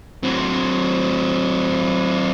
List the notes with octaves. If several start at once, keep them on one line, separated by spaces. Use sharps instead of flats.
F#3 C4